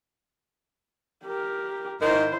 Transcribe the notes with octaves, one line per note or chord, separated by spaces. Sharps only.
G4 A#4
G#2 D#3 E4 C5